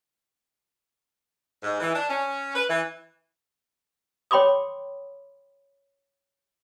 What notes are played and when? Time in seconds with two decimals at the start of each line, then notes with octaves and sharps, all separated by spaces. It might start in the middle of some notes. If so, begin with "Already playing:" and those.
1.63 G#2
1.80 E3
1.94 D4
2.09 C#4
2.54 B4
2.67 E3
4.31 C#5 G5 B5 C6 D6 D#6